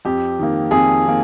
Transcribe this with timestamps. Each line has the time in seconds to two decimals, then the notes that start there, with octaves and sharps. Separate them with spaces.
0.05 F2 G4
0.39 D#3 A#3
0.71 F2 G#4
1.05 D#3 A#3